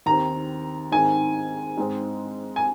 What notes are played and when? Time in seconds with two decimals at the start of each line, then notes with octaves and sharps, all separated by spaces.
0.06 D#2 D#3 C4 A#5
0.92 G#2 D#3 C4 G#5
1.77 G#2 G#3 C4
2.56 G#5